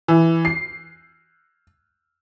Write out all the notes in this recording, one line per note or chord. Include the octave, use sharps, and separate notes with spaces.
E3
C7